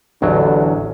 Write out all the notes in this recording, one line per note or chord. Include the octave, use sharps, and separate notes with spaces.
A1 E2 D3 F#3